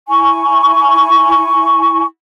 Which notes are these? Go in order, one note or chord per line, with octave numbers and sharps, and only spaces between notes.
E4 G#5 C#6